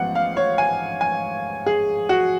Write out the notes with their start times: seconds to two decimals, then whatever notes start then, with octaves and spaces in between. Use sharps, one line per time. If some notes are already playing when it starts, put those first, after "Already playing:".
Already playing: A1 G#2 F3 B3 F#5
0.15 F5
0.37 C#5
0.58 G#5
1.01 G#5
1.66 G#4
2.09 F#4